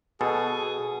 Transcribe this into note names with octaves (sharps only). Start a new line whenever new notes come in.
B2 G#4 A4